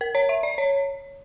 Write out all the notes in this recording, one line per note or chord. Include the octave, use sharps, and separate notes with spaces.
A#4
C#5
E5
D5
C#5